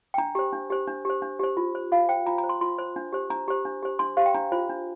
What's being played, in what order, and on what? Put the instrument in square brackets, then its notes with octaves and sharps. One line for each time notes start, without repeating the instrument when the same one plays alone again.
[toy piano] G5
D4 A#5
G4 C5
D4
G4 C5
D4
G4 C5
D4
G4 C5
F4
C5
F4 F5
C5 G5
F4 A#5
A#5
C5
C6
F4 C6
C5
D4
G4 C5
D4 A#5
G4 C5
D4
G4 C5
D4 C6
G4 C5 F5
G5
D4 A#5
F4 C5
D4